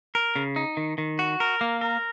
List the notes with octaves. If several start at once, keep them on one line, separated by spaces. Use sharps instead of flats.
A#4
C#3
D#4
D#3
D#3
F#4
A#4
A#3
A#4